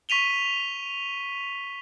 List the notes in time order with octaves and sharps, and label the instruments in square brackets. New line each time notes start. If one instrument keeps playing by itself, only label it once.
[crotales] C#6 B6 D#7 F7 G7